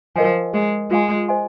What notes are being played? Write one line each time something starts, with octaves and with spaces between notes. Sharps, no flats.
F3 A#4 D#5 G#5
G#3 G#4 D#5 G#5
G#3 F4 G#4 F5 G#5 C6
C5 D#5 G#5 C6